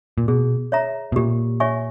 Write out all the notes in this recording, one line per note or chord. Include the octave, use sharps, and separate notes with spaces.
A#2
B2 G#4
C#5 E5 A#5
B2
A#2 G4
C#5 E5 G#5 C#6